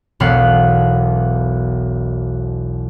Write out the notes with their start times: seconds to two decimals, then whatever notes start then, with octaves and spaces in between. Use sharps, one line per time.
0.20 E1 B1 B3 F5 F#5